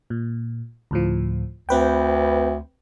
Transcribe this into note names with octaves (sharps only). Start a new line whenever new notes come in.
A#2
D2 A2 F3
D2 C4 B4 G5